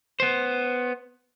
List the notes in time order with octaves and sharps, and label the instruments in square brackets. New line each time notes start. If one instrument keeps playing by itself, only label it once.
[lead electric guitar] B3 C5